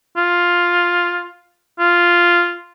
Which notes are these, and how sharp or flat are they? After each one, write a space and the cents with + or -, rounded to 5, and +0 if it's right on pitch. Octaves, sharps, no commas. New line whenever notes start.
F4 +5
F4 -5